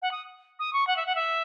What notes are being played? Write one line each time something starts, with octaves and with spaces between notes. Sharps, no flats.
F#5
D#6
D#6
C#6
F#5
E5
F#5
E5